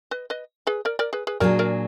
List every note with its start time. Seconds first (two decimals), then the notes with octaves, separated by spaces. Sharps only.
0.11 B4 D#5
0.30 B4 D#5
0.67 G#4 B4
0.85 A#4 D5
0.99 A#4 D5
1.13 G#4 B4
1.27 G#4 B4
1.40 A#2 F#3 A#3 D4 G#4 A#4 D5
1.59 A#4 D5